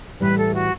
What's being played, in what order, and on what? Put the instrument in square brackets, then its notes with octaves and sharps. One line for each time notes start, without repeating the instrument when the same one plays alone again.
[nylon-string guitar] A2 E3 G3 [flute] B4
[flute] A4
F#4